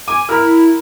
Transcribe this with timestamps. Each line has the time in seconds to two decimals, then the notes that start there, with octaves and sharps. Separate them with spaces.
0.08 G#5 D6
0.29 E4 A#4 F6